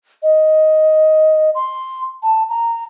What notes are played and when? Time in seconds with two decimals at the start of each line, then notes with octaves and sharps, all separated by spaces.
0.23 D#5
1.55 C6
2.23 A5
2.49 A#5